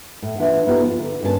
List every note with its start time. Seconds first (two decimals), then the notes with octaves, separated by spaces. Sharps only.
0.22 A2
0.38 E3 D4 F4 E5 F#5
0.66 B3 D#4 F4 G4 A4
0.83 F3 F4
0.99 D3
1.23 G2 A#3 C#4 G#4 A5